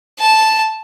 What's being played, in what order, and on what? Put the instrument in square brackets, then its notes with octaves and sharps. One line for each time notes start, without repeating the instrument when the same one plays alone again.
[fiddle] A5